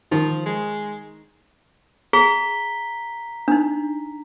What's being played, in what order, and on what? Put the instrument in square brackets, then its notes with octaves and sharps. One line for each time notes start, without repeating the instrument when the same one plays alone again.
[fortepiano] D#3 [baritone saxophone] F3
[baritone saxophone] G#3
[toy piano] G#4 [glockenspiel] A#5 B6 G7
[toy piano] D4 D#4